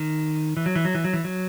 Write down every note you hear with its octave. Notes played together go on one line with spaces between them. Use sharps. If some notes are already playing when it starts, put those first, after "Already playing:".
Already playing: D#3
E3
F#3
E3
F#3
E3
F#3
E3
F#3